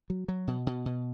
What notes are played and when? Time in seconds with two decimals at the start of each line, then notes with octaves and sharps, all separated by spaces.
0.10 F#3
0.28 F#3
0.47 B2
0.67 B2
0.86 B2